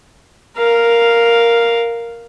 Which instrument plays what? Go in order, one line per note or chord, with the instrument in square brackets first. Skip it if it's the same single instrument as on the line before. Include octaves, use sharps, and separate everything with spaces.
[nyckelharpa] A#4 F5